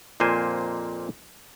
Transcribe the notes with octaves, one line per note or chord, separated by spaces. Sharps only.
F2 A#2 A#3 C5 G#5